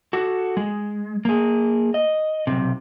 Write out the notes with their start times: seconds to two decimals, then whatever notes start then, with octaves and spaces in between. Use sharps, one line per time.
0.13 F#4 A4
0.57 G#3
1.25 A#3 G#4
1.94 D#5
2.47 B1 C3